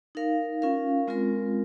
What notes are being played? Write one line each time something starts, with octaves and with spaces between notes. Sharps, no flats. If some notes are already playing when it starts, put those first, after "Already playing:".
D#4 A#4 F5
C#4 F4 A#4 F5
G#3 C4 F4 A#4